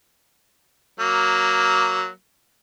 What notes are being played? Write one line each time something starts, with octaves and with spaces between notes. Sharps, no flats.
F#3 A#3